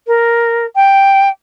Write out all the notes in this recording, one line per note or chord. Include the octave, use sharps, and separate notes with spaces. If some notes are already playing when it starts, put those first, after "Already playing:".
A#4
G5